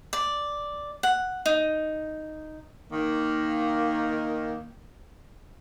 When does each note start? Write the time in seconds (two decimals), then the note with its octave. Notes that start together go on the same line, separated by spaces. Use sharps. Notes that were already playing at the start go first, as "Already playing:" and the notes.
0.13 D5
1.03 F#5
1.46 D#4
2.93 D#3 A#3